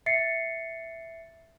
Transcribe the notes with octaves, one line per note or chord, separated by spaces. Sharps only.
E5 A6 C7 C#7